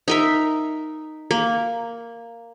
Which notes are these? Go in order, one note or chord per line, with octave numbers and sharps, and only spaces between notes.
D#4 A#4 E5
A#3